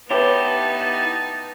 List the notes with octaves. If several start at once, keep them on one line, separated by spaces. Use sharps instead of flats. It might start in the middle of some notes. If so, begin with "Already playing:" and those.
B3 D#4 E4 G4 B4 C#5 A5